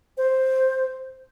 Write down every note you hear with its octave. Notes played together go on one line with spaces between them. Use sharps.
C5